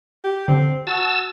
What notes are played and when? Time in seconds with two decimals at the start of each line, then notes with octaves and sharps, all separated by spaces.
0.24 G4
0.48 D3 C4
0.87 F#4 A5 E6